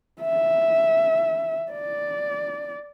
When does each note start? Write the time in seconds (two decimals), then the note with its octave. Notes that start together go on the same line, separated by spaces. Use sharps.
0.22 E5
1.72 D5